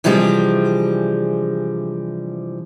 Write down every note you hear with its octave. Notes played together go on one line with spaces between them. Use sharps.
C3 E3 F3 G3 G#3 D4